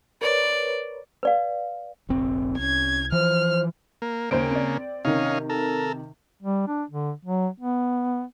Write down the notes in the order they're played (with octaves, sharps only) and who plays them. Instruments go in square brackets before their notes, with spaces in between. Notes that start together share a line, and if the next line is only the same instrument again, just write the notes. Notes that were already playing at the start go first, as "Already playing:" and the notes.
[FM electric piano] A#4 B4 C#5 [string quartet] D5
[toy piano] B4 D5 F5
[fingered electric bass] F1 A#1 C4
[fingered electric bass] C2 [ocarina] C#4 [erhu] G#6
[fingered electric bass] E3 F3 [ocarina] C5 [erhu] F6
[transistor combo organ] A#3
[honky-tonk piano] D#2 C5 D7 [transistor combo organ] C#3 A#3
[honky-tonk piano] C4 D5
[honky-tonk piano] C3 D#3 [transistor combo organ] C#4 D#4 F5
[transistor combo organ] A4 A#4
[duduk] G3
D4
D3
F#3
B3